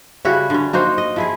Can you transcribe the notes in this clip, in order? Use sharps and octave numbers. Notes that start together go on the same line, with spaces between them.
C#3 G3 E4 F#4
D3 C#4
A#3 D#4 F#4 C5
D#5
F3 E4 G#4